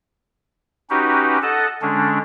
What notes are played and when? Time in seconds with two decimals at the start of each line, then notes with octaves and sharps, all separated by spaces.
0.90 C#4 D#4 F#4 G4 B4
1.42 A4 D#5 F#5 A5
1.82 D3 G#3 C#4 D4